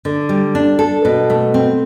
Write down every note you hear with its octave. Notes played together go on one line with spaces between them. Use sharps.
D3
G3
D4
A4
B2
A3
C4